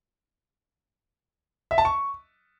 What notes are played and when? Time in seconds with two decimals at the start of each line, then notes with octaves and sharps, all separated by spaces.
1.71 E5
1.78 A5
1.85 C#6